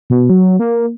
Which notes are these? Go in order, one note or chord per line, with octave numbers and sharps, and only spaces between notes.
B2
F#3
A#3